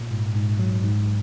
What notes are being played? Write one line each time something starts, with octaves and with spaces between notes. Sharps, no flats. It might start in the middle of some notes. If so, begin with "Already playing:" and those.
Already playing: A#2
G#2
G#2
F#3
G#2